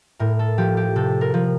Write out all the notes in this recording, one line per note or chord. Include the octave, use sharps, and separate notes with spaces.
A2 A#4
A4
F3 G4
G4
C3 A4
A#4
F3